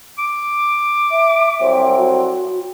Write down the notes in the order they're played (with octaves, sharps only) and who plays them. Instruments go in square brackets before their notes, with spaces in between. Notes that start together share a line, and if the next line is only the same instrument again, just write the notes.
[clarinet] D6
[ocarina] E5
[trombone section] C2 F#3 C4
[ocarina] F#4